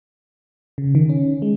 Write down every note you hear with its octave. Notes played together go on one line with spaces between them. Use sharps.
C#3
D#3
C#4
G#3